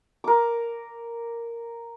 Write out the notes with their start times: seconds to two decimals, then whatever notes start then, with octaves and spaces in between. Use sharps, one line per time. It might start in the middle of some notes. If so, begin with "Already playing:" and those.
0.24 A#4 D6